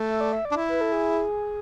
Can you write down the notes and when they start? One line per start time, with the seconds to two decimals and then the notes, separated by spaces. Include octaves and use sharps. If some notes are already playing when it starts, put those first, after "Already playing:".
Already playing: A3
0.09 E5
0.21 D5
0.33 E5
0.45 D5
0.51 D4
0.56 E4
0.69 B4
0.81 A4
0.92 G#4